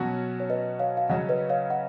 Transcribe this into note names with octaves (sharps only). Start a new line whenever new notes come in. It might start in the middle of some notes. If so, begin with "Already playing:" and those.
Already playing: B2 F#3 C#4 F#4
C#5
B4 D#5
C#5 F5
F5
C#3 F#3 C#4 D#5 F#5
B4 D#5
C#5 F5
D#5 F#5